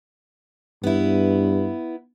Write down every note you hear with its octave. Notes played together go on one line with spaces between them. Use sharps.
G2 B3 E4